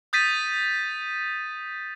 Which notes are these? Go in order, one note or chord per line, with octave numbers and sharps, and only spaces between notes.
D#6 G6 A6 B6 D#7